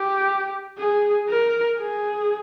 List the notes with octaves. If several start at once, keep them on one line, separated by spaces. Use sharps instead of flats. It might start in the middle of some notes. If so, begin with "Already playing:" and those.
Already playing: G4
G#4
A#4
G#4